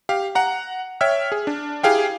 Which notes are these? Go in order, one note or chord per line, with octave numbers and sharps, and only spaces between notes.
G4 F5
F#5 A#5
C#5 E5 G5 C#6 F6
G#4
D4
E4 G4 G#4 F5 G5